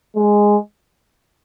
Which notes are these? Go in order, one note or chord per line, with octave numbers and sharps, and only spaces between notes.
G#3